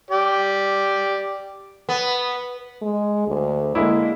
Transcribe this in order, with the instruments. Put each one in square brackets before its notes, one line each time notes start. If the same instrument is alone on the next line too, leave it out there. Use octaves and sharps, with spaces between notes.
[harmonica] G4 D5
[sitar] B3
[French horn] G#3
D2
[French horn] D3 [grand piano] G#3 A#3 E4